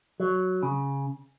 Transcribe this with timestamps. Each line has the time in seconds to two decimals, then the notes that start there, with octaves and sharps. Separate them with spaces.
0.20 F#3
0.63 C#3